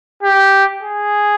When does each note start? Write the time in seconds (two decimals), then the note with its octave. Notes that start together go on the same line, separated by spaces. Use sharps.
0.23 G4
0.83 G#4